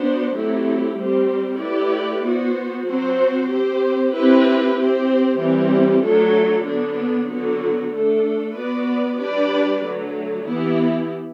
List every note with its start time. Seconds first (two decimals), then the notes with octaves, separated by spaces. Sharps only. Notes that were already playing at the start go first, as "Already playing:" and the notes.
Already playing: B3 D4 F#4 C5
0.34 F#3 A3 C4 E4 G4
0.97 G3 C4 G4 C5
1.60 A3 E4 G4 B4 D5
2.23 B3 F#4 C5
2.86 F#3 C4 F#4 C5
3.50 C4 G4 C5
4.13 C4 E4 G4 B4
4.76 C4 G4 C5
5.38 E3 G3 C4 G4
6.02 F#3 A3 D4 A4
6.65 D3 F#3 B3 D4
7.28 D3 F#3 B3 F#4
7.91 A3 D4 A4
8.55 B3 F#4 B4 D5
9.17 G3 D4 G4 B4 D5
9.81 D3 F#3 A3
10.44 E3 B3 E4 G4